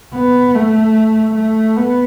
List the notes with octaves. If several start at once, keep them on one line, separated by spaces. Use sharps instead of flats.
B3
A3
A3
B3